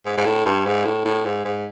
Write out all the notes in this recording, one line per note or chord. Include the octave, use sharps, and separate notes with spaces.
G#2
G#2
A2
G2
G#2
A2
A2
G#2
G#2